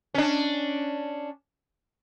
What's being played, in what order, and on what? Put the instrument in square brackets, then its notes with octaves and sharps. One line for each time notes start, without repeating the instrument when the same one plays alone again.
[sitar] C#4 D4